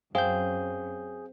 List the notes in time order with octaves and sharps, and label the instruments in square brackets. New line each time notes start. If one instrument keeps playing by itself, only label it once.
[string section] F#2 [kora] C4 [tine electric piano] G#4 G6 [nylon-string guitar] F5